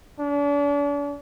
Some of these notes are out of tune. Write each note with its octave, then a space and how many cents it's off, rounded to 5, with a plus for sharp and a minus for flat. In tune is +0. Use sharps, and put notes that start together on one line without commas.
D4 -40